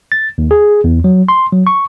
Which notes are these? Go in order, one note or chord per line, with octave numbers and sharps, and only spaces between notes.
A6
D#2
G#4
E2
F#3
C6
F#3
C#6